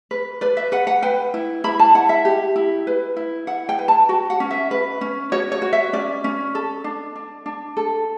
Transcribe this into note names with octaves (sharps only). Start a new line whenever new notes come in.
B4
B4 D5
E5
B4 F#5
F#5
B4 G5
E4
E4 B5
A5
E4 F#5
E5
G4
E4
B4
E4
E4 F#5
G5
B4
A5
F#4 G5
F#5
C#4
E5
B4
C#4
F#4 C#5
C#5
F#4
E5
C#4 D5
C#4
A4
D4
D4
D4
A4